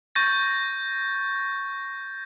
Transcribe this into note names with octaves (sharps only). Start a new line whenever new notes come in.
C#6 G6 A6 A#6